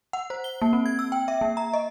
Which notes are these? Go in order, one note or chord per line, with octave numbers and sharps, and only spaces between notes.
F#5
C5
G7
A#3
C4
G#6
E6
G5
E5
A#3
A#5
D#5